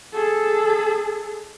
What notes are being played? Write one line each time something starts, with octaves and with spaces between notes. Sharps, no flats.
G#4 A4